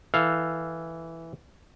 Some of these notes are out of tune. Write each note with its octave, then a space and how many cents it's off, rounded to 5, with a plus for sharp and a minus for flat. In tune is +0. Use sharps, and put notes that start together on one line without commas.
E3 +0 A4 +10 F5 +0